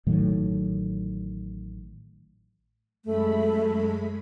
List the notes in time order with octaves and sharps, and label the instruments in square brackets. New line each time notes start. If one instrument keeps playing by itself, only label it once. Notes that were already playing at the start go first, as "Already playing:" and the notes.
[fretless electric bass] A1 A2 D#3 F#3
[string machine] F#2 G#3 B5 [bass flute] A3